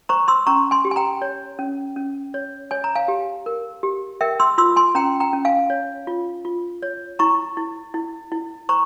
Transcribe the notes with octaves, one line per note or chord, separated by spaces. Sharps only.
C5 A#5 C#6
C6 E6
C#4 A#5 C#6
G#5 C6
G4
G#5
G5 A#5
C#5
C#4
C#4
C#5
C#5 G#5
A#5
F5 G#5
G4
A#4
G4
A#4 E5 G5
C6 E6
F4 C6 E6
G#5 C6
C#4 G5 A#5
G5 A#5
C#4
F5 G#5
C#5
F4
F4
C#5
E4 A#5 C#6
E4
E4
E4
C5 A#5 C#6